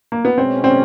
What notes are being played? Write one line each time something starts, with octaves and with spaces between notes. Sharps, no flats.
A#3
B3
B2 G#3 C4 C#4
C4